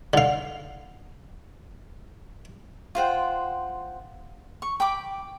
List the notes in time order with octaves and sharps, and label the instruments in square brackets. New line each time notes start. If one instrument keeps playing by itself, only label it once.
[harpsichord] D3 F5
[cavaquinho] F4 C5 F#5 G5
C#6
G5 B5 D6